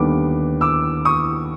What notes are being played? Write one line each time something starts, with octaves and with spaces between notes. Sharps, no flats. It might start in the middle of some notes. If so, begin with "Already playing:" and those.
Already playing: D#2 D3 G3 B3 D6
D6 E6
C#6 D#6